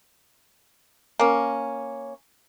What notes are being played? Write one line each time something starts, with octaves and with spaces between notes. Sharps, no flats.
A#3 C#4